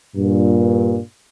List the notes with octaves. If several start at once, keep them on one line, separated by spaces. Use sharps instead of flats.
G2 A#2